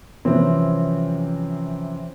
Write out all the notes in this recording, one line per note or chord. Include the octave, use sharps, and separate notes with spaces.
C3 E3 F3 G3 C4 C#4